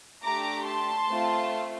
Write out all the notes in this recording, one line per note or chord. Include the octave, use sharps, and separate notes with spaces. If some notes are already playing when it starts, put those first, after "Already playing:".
A3 D4 G4 A#5 D6
A5 C6
A3 C4 F4